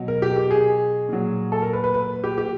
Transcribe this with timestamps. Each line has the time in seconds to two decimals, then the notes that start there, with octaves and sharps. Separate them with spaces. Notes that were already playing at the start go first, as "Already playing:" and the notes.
Already playing: B2 F#3
0.08 A#4
0.22 G4
0.37 G4
0.51 G#4
1.09 A#2 F#3
1.52 A4
1.62 A#4
1.73 B4
1.84 B4
1.94 B4
2.24 G4
2.38 G4